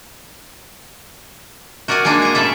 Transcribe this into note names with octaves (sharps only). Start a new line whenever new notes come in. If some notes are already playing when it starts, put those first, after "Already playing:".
F#4 A#4 D5 F#5 G#5
G#3 A#3 D4 D#4 G#4
D#5 A#5
A2 C#3 A4 D5 E5